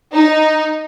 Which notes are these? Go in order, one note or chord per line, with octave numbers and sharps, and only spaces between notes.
D#4